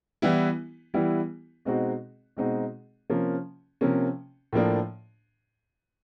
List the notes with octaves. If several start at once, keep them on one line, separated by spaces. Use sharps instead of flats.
E3 G3 B3 E4
E3 G3 B3 E4
B2 G#3 C4 D#4 F#4
B2 G#3 C4 D#4 F#4
C3 F3 A#3 C#4
C3 F3 A#3 C#4
A2 F3 A#3 D4